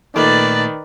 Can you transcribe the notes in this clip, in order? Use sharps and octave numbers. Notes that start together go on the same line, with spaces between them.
A#2 D#3 A3 B4 D5 A5 D6